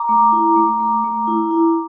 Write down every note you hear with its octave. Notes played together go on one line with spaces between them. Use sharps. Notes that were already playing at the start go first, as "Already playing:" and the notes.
Already playing: A#5 D6
A3
E4
A3
A3
A3
E4
E4